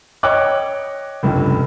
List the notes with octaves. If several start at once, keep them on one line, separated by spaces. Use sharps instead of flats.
C#5 D#5 G5 D6 F#6
F1 C#2 G2